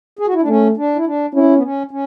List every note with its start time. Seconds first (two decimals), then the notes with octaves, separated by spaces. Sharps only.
0.19 G#4
0.27 F#4
0.34 E4
0.41 D4
0.48 A3 C#4
0.77 D4
0.96 E4
1.06 D4
1.34 C#4 E4
1.57 B3
1.63 C#4
1.91 C#4